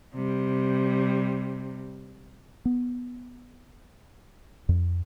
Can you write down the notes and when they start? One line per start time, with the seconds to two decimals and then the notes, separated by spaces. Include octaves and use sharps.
0.15 C3 G3
2.65 B3
4.69 F2